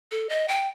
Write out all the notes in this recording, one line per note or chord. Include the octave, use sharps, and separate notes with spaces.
A4
D#5
G5